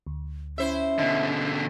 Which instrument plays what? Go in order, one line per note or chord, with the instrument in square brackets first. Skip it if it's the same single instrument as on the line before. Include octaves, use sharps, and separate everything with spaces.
[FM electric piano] D2
[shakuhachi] C#4 [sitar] E4 C5 E5
[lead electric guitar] B2 D3 [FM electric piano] D#5 G#6